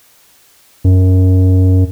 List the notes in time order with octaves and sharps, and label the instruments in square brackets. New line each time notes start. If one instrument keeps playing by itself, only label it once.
[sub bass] F#2